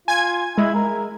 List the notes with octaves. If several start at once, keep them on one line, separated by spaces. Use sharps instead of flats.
F4 G#5 G#6
G#3 E4
A#4